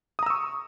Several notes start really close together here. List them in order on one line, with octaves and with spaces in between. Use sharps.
D#6 A#5 E6 C#6